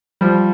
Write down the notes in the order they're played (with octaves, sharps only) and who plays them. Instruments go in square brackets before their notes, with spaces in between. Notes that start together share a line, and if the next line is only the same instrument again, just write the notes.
[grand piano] F3 G3